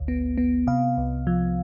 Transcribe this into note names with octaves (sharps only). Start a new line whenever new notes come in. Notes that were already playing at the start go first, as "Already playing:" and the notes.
Already playing: G#1 D2
B3
B3
C3 F5
C2
F3